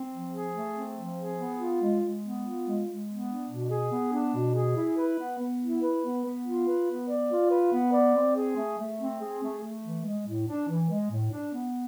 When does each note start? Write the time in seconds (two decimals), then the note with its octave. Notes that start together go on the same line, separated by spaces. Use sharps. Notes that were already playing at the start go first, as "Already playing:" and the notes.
Already playing: C4
0.11 F3
0.32 G#4
0.54 A3
0.75 C4
0.96 F3
1.16 G#4
1.38 B3
1.59 F4
1.80 G#3
2.02 G#3
2.23 B3
2.44 F4
2.66 G#3
2.86 G#3
3.07 B3
3.28 D4
3.49 B2
3.71 G#4
3.92 B3
4.13 D4
4.35 B2
4.55 G#4
4.76 E4
4.97 B4
5.19 B3
5.39 B3
5.61 E4
5.82 B4
6.03 B3
6.25 B3
6.45 F4
6.67 B4
6.88 B3
7.09 D5
7.30 F4
7.51 B4
7.73 B3
7.93 D5
8.15 C4
8.36 G#4
8.57 A3
8.79 A3
9.00 C4
9.21 G#4
9.41 A3
9.63 A3
9.83 E3
10.05 G#3
10.27 A2
10.48 D4
10.69 E3
10.90 G#3
11.11 A2
11.32 D4
11.53 B3